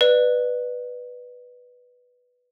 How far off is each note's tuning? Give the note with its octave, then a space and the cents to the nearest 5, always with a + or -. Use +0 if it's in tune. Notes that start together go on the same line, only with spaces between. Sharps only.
B4 +0 D5 +30